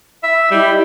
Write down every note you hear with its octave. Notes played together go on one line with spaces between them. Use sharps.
E5
G3 E4 D#5 E5